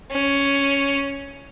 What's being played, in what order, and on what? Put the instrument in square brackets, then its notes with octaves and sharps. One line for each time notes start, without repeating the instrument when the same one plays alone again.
[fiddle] C#4